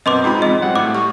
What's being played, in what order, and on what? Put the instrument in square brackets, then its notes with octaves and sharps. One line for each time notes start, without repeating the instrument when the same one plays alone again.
[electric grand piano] F#2 B2 B3 [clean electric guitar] C4 [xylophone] D#5 C6 D6
[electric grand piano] G#2 B5 [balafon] F4 G5 A#5
[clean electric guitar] E2 G#3 C4 [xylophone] D#5
[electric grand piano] F#3 G3 C4 [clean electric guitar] F#5
[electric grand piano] A2 [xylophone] D6
[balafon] A3 G4 C#6